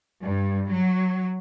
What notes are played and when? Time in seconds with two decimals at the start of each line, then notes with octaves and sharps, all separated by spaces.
0.22 G2
0.70 F#3